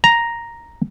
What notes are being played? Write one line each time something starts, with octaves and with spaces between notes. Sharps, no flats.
A#5